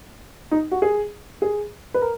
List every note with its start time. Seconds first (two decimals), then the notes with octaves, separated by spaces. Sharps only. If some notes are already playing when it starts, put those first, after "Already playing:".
0.51 D#4
0.71 F#4
0.82 G#4
1.42 G#4
1.94 B4
2.02 A#4